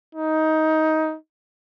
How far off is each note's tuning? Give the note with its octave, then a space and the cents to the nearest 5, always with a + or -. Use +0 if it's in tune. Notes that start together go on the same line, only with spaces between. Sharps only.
D#4 +15